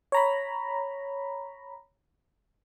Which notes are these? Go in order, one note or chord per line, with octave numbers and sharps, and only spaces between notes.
C#5 A#5 B5